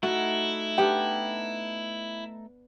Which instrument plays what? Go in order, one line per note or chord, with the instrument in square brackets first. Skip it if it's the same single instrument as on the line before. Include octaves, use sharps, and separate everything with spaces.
[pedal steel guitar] A3 D#4 [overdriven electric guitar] E4 [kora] F#4
[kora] B3 D4 [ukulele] G4 G5